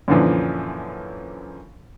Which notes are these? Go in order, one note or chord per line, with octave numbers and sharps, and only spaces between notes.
F#2 A#2 D3 E3 F3